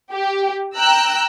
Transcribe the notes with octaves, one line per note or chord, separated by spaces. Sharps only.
G4
G5 A#5 E6 F#6